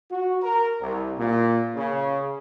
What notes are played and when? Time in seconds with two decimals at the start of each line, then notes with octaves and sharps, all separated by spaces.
0.10 F#4
0.42 A#4
0.80 C2
1.18 A#2
1.74 C#3